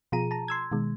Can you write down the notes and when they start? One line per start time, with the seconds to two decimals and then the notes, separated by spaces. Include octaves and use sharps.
0.12 B2 F3 F4 G#4 A#5 D#7
0.31 A5 A#5
0.48 C6 E6 G#6
0.71 B2 D#3 G#3